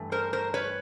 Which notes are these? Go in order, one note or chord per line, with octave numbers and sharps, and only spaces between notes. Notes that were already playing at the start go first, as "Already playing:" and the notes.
Already playing: G2 E3 A3
A#4 C5
A#4 C5
B4 C#5